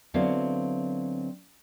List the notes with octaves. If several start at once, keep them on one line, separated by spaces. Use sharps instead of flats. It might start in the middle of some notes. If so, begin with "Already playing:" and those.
D3 F#3 B3 C4 E4 F5